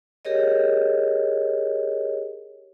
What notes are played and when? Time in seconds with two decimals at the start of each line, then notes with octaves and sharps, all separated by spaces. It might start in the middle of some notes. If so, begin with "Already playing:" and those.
0.25 G4 G#4 A#4 C#5 D#5